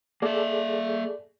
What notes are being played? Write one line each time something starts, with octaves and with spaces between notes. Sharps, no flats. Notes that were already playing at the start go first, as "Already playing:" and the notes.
A#3 G#4 A4 D5 E5